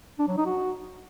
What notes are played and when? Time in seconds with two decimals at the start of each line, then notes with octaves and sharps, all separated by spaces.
0.19 D4
0.28 F#3
0.37 D#4
0.46 F#4